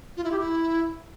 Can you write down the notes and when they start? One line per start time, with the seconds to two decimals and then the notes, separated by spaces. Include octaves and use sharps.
0.17 F4
0.24 E4
0.32 G4
0.39 E4